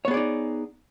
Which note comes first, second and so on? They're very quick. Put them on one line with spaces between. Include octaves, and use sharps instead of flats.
C#5 B3 G#4 D5 D#4